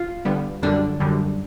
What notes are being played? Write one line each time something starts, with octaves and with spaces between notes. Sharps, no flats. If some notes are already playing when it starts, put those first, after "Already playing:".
Already playing: F4
D3 G3 B3
F#2 D3 G3 D4
F#2 D3 G3